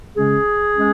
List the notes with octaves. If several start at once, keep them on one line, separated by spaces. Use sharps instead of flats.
C#3 G#3 C#4 G#4
G#3 C#4